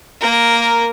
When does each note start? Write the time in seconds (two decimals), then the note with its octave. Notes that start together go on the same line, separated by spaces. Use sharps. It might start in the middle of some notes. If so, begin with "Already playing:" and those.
0.20 A#3 A#4